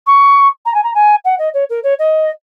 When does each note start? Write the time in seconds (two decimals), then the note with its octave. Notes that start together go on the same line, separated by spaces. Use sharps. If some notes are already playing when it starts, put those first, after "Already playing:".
0.06 C#6
0.65 A#5
0.74 G#5
0.83 A#5
0.94 G#5
1.24 F#5
1.38 D#5
1.53 C#5
1.69 A#4
1.83 C#5
1.99 D#5